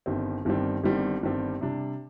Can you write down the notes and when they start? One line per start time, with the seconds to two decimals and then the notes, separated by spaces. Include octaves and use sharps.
0.06 G1 G2 D#3 G3 C4
0.45 G1 G2 D#3 G3 C4
0.84 G1 G2 D#3 G3 C4
1.23 G1 G2 D#3 G3 C4
1.61 C3 G3 D4